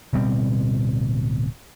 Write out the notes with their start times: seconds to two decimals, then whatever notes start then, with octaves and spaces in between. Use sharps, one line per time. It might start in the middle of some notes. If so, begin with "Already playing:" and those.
0.13 D1 B2 G3 C4